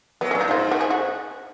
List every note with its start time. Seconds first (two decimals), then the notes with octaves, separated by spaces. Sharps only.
0.21 F#3 B3
0.31 C#4
0.35 A#2
0.41 D#4
0.48 G#2 F4
0.71 F#4
0.81 G#4
0.90 F#4